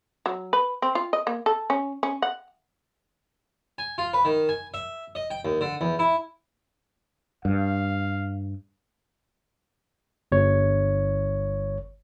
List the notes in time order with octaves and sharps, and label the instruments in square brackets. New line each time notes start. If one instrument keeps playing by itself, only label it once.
[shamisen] F#3
B4
C4
F4
D#5
A#3
A4
C#4
C#4
F#5
[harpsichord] G#5
F4
B4
D#3
G#5
E5
D#5
G5
D#2
D3
E2
E4
[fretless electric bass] G2 [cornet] F5
[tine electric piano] G1 C#5